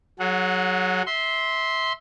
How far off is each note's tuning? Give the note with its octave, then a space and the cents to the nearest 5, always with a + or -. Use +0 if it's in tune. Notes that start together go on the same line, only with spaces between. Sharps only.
F#3 +0 G#4 +30 F#5 -30
E5 -25 C6 +0